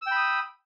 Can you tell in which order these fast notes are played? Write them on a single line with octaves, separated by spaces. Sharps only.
E6 G5 B5 D#6